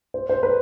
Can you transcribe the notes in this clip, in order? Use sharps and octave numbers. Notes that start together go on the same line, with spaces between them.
C5
C5
B4